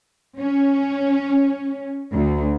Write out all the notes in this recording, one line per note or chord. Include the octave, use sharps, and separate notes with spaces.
C#4
D2